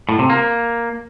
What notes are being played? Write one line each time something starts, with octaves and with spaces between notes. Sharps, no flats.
A2
C3
A#3